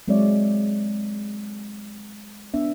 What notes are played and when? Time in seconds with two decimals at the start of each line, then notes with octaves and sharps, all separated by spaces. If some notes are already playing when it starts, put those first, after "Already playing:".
0.08 F#3 G#3 C4 C#5 D5 E5
2.54 B3 D4 E5